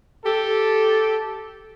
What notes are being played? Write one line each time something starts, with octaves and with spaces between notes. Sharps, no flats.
G4 A4